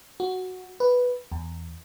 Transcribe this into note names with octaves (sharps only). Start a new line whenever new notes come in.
F#4
B4
E2